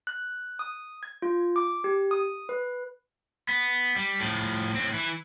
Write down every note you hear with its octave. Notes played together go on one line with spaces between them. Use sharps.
F#6
D#6
G#6
F4
D6
G4
D#6
B4
B3
G3
A2 F3
A2 C4
E3 E4